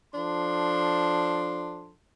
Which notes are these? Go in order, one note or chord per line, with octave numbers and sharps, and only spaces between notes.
F3 D4 A4 C6